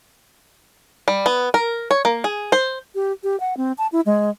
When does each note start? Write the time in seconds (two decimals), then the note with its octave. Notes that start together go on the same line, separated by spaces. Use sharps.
1.08 G3
1.26 B3
1.54 A#4
1.91 C#5
2.05 A#3
2.24 G#4
2.52 C5
2.95 G4
3.23 G4
3.40 F#5
3.57 C4
3.78 A5
3.92 E4
4.06 G#3